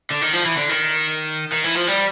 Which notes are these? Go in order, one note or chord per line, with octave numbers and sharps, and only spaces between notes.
D3
D#3
F3
E3
D3
D#3
D#3
E3
F3
G3